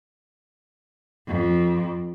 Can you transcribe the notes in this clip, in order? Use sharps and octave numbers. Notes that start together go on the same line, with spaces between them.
F2